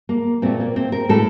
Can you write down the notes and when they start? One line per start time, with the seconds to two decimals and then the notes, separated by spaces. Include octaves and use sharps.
0.09 A#3
0.42 A#2 A3 C4
0.60 A#3
0.76 C4
0.92 A#4
1.09 A2 A3 A4